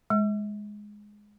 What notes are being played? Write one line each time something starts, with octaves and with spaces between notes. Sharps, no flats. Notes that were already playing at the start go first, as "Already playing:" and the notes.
G#3